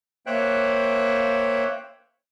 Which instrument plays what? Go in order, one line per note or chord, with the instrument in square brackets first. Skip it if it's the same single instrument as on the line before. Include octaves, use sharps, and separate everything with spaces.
[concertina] A#3 C5 C#5 E5 G5 F#6